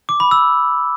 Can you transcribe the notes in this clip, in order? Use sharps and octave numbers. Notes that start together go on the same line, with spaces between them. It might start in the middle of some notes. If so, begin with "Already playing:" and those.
D6
B5
E6